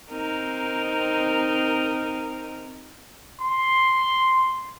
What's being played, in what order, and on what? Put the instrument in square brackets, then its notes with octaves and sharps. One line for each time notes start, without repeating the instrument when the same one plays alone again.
[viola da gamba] C4 D#4 A#4
[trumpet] C6